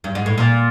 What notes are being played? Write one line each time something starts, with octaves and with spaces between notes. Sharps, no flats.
G2
G#2
A2
A#2